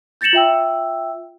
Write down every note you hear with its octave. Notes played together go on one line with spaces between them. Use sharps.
G6 A6 A#6 C#7 E7 F#7
F4 E5 G5 E6